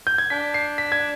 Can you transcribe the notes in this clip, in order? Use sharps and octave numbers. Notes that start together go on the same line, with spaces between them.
G6
G#6
D4 B6
C7
B6
G#6